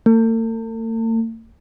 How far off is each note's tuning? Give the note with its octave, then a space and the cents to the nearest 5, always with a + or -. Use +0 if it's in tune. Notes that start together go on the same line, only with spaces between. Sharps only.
A3 +45